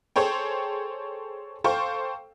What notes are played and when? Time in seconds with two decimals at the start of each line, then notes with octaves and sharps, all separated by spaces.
0.16 G#4 A4 C5 C#5 G5
1.64 A4 C5 F5 G5 C#6